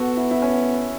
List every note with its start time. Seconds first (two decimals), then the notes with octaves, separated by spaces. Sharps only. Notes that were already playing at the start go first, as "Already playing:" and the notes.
Already playing: B3 F#4 A4
0.17 E4
0.31 E4
0.42 C#4